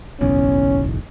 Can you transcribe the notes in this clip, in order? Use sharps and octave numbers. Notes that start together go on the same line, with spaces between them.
F#1 B1 E2 C#4